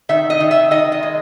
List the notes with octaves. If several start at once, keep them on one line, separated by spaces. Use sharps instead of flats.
D#3 E5
D#5
D#3
E5
D#3 D#5
D#5
G#3